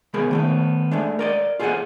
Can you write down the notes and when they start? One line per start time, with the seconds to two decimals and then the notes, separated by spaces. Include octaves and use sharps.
0.14 C2 G#3 B3 G#4 A#4 B5
0.31 D#3 A3 B3
0.91 G#3 A3 D4
1.19 A#4 D5 D#5
1.59 F4 G#4 A4 C5 D#5 F#5